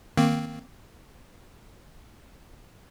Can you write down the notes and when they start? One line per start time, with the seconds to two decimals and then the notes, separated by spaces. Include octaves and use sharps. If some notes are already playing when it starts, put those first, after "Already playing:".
0.17 D#3 A#3 C4